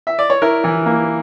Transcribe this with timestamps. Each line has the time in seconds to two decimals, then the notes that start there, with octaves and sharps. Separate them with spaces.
0.07 E5
0.19 D5
0.30 C#5
0.42 E4 A#4
0.64 E3
0.86 A#3